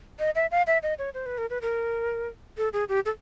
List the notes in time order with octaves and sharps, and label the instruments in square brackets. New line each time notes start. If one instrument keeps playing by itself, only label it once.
[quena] D#5
E5
F5
E5
D#5
C#5
C5
B4
A#4
B4
A#4
A4
G#4
G4
A4